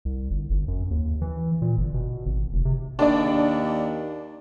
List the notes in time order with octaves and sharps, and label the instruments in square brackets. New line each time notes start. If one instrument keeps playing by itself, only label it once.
[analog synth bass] C2
G1
G1
F#2
D#2
E3
A#2
G1
B2
G#1
F1
C3
[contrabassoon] D#2 [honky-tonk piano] D4 D5